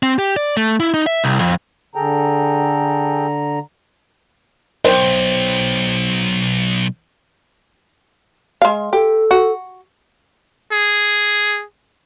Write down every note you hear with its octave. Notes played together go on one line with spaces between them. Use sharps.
C4
G4
D5
A3
E4
D#4
E5
C2
F2
D3 G#4 A4 G5 A#5
B1 C5 G5
G#3 F5
G4 A4
F#4
G#4